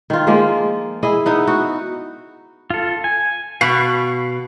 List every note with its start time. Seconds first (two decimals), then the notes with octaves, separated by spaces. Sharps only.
0.10 D#3 F4
0.27 F3 G#3 A#3
1.03 E4 G#4 D#5
1.26 B3 D#4 E4
1.47 F#4
2.70 F4 A4
3.04 G#5
3.61 B2 F5 B5 C#6